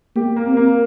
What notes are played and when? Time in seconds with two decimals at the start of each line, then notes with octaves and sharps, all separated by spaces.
0.16 A#3 G4
0.36 A#3
0.47 C4
0.57 A#3